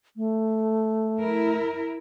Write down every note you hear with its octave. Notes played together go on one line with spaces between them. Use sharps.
A3
E4 A#4